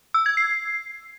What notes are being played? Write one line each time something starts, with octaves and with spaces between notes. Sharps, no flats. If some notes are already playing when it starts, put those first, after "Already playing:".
E6
G#6
C7